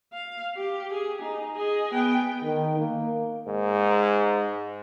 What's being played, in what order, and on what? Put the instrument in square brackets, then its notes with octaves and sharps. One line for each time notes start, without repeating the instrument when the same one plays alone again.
[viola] F5
G4
G#4
D#4
G#4 D#5
B3 G5
[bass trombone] D#3
A#3
[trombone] G#2